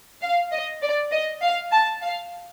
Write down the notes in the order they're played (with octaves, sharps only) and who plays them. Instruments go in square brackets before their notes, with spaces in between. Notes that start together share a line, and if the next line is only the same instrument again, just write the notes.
[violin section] F5
D#5
D5
D#5
F5
A5
F5